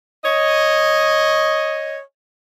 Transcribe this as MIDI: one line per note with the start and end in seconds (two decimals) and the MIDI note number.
0.25 1.99 73
0.25 1.99 75